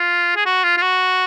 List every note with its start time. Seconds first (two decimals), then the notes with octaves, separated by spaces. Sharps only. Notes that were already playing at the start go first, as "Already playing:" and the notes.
Already playing: F4
0.36 G#4
0.45 F#4
0.64 F4
0.77 F4
0.82 F#4